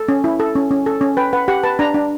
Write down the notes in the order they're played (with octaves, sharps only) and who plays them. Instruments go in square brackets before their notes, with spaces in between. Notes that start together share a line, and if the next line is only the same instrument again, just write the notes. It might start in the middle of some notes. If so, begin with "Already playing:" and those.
Already playing: [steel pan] A4
C#4
E4
A4
C#4
C#4
A4
C#4
B4 G5
B4 F#5
G4 F#5
B4 A5
D4 A#5
D4